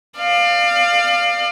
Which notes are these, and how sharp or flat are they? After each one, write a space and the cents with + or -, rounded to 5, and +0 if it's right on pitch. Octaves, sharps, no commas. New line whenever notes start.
D5 +35 F5 +0